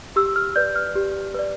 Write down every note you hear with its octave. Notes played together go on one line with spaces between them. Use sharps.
G4 E6
F6
B4 D5 G6
F6
G4
B4 D5